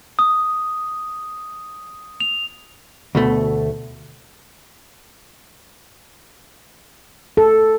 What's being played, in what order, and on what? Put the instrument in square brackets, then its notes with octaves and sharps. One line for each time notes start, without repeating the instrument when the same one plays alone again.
[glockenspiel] D#6
F7
[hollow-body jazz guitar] D2 B2 A3
[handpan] A4